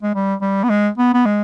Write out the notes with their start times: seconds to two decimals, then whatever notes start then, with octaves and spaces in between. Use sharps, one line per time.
0.03 G#3
0.15 G3
0.42 G3
0.64 B3
0.70 G#3
0.98 B3
1.14 B3
1.26 G#3